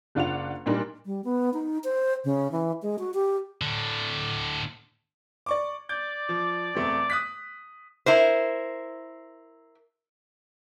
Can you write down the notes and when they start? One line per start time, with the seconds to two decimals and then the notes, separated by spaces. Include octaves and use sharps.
0.15 F#1 D4 F4 F#5 F7
0.66 A#2 G3 D4 D#4 A#4
1.06 G3
1.24 B3
1.54 D#4
1.84 C5
2.24 C#3
2.52 E3
2.82 G#3
2.99 F#4
3.14 G4
3.62 A2 D3
5.46 D5 C#6 D6
5.89 D5 D6 G6
6.29 F3
6.75 E1 A3 C4
7.10 D#6 F#6 B6
8.06 E4 A#4 C5